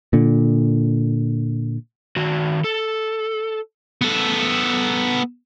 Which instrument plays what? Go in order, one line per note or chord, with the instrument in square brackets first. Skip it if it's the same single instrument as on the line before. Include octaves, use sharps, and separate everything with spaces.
[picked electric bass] A#2 D3
[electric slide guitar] D#3 F#4
A4
[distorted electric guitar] B3 A4